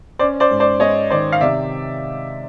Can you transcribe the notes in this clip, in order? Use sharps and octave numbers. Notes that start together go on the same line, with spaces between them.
C#4 C5 D5
C5 D5
G#2
C5 D5
G#3 C#5 D#5
D#3 C5 D5
F5
C3 D5 E5